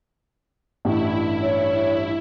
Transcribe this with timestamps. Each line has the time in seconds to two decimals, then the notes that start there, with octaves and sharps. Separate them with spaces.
0.85 A1 G2 G3 E4
1.42 C#5